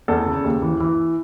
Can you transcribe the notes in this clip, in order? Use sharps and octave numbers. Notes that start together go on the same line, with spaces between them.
E2 A4
C#3
D#2
E3
E3